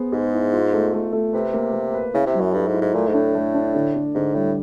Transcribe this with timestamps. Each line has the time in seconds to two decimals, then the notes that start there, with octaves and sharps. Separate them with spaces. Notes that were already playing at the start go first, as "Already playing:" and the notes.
Already playing: B3 G#4 C5
0.12 G#2 G#4
0.33 E4
0.53 F4
0.73 A3
0.94 A3
1.13 A3
1.33 C3 B4
1.54 A#3
1.73 A#3
1.94 B4
2.14 C#3 E4
2.27 C3
2.34 F#3
2.41 F#2
2.54 G2 A4
2.67 G#2
2.74 E4
2.81 G#2
2.94 A#2 A3
3.08 G#2
3.14 A2 D4
3.35 A3
3.55 D4
3.74 D3
3.94 D3
4.15 G#2 D3
4.35 A2 G3